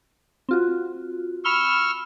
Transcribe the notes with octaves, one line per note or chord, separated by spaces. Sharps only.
C4 F4 F#4
B5 C#6 E6 F6 F7 G7